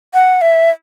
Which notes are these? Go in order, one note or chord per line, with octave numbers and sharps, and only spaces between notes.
F#5
E5